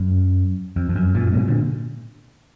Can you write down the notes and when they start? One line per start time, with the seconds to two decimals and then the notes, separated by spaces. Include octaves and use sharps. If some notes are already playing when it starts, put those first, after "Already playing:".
Already playing: F#2
0.76 F2
0.89 F2
0.96 F#2
1.15 F#2 A#2
1.33 G#2 B2
1.48 A#2 D3